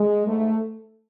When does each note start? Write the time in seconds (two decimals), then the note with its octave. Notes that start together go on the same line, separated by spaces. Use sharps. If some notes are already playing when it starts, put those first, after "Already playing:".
Already playing: G#3
0.26 G#2 A3